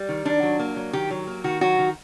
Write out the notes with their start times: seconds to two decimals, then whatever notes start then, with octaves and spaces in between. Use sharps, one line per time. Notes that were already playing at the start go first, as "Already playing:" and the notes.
Already playing: G3
0.09 D#3
0.25 D#3 D4
0.43 F#3
0.59 A#3
0.76 F#3
0.93 D#3 G4
1.10 F#3
1.27 A#3
1.44 D#3 F#4
1.61 F#3 F#4
1.79 D#3